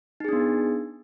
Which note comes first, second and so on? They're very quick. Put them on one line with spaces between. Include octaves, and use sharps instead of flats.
D#4 G#4 D4 B3